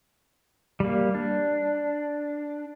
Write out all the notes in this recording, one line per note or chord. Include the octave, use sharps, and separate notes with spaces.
G3 A#3
D4